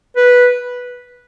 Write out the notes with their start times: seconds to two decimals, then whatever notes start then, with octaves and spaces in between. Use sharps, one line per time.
0.16 B4